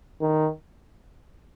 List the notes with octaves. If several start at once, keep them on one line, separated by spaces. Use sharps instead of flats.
D#3